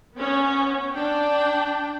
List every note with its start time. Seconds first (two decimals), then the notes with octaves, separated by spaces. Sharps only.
0.13 B3 C#4
0.94 D4 G5